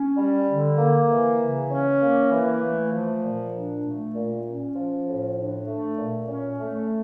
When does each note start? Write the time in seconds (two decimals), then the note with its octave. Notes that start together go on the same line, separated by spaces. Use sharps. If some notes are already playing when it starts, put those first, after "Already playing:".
Already playing: C#4
0.17 G3
0.48 D3
0.78 A#3
1.09 E3
1.40 C#3
1.70 C#4
2.01 A#3
2.31 E3
2.61 A3
2.92 F3
3.22 A#2
3.53 D4
3.84 A3
4.14 A#2
4.45 C#4
4.75 F3
5.06 A2
5.37 D4
5.67 A3
5.97 A#2
6.28 C#4
6.58 A3